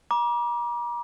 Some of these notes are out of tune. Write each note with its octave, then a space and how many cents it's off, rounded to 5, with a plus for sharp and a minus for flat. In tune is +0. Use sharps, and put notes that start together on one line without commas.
A#5 +40 D6 +0